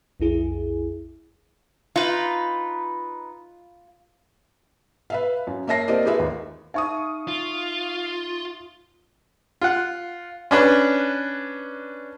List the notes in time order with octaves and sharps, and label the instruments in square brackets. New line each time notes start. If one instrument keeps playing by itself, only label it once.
[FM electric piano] B1 F2 E4 G#4
[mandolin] D#4 B4 [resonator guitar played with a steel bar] F4
[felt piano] B4 E5 F5
F#2
A#3 C#5 E5 A5 A#6 C7
A#3 C4 G4 A#4 D5 D#5
D#4 F4 G4 G#4 B4 E5
D#2
[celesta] D#4 E5 [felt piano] F5 C#6 D#6
[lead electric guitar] F4
[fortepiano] F4 F#5
C#4 D4 B4